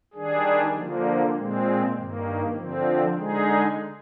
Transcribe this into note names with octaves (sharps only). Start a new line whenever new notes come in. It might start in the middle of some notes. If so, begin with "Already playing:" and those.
D#3 G3 D4 G#4
D3 F3 A#3
A#2 G#3 C4
G2 D#3 A#3
D3 F3 C4
D3 G#3 D#4 G#4